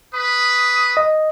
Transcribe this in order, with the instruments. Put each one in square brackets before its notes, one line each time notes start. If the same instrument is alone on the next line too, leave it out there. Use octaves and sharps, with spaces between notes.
[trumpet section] B4 B5 [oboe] D#6
[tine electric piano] D#5